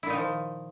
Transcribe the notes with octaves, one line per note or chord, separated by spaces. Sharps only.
A#2 D#3 F3 D#4 E4